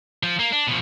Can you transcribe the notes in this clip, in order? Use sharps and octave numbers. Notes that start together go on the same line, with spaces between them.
F3
A#3
D4
B2 F3